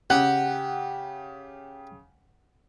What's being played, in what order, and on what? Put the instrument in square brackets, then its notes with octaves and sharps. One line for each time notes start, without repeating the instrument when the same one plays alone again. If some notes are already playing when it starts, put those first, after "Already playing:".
[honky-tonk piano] C#3 [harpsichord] G4 [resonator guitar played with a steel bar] F#5